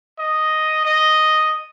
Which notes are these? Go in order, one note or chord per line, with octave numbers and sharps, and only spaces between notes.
D#5
D#5